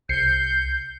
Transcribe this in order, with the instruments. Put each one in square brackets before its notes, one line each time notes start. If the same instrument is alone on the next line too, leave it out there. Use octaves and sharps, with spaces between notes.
[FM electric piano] C2 C7 C#7 [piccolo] G6